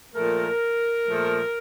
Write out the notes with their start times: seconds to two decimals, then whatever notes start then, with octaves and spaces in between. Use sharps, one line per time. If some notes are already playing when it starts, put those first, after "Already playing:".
0.14 A#2 F3 A3 A#4
1.07 A#2 F3 A3